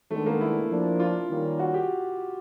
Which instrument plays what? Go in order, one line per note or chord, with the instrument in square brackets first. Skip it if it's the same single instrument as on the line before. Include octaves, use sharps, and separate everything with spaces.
[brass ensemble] D#3 G#3 B3 D4 [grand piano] A3
[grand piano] A#3
E4
[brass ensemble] F3 A#3 D4
[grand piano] F4
[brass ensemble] D#3 G3 A#3 C#4
[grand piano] F#4
G4